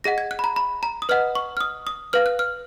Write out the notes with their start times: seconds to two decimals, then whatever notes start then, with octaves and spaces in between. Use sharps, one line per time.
0.04 G#4 D#5 F#5 A#6
0.18 G#6
0.31 F#6
0.39 B5
0.44 A#5
0.56 B5
0.83 A#5
1.02 D#6
1.09 B4 D#5 F#5 F6
1.35 C#6
1.57 F6
1.61 D#6
1.87 D#6
2.13 B4 F5 F6
2.26 F#6
2.39 F6